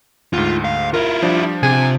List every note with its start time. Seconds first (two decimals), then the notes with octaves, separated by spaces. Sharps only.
0.33 D2 G#2 F4
0.64 F5
0.94 E4 F4 A#4
1.22 F3 G3 D4
1.63 C3 G#5